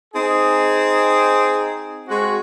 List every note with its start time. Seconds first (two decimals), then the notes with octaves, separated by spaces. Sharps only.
0.14 C4 D#4 G#4
2.08 G#3 C4 F#4